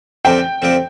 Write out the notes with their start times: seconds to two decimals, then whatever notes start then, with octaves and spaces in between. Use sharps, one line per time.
0.25 F2 D3 F3 C4 G4 G5
0.62 F2 D3 F3 C4 G4